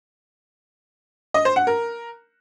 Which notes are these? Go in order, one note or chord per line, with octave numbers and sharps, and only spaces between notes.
D#5
C5
F#5
A#4